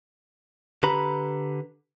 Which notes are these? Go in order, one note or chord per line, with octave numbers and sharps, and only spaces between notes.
D3 G4 B4 A#5 B5